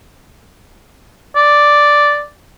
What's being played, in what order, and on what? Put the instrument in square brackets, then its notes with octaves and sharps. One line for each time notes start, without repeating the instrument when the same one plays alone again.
[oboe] D5